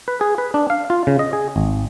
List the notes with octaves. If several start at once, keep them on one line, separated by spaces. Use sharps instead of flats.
B4
G#4
B4
D4
F5
F4
C#3
D#5
G#4
G#1